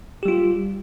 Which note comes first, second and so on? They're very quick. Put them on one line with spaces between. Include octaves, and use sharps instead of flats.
G4 G3 F4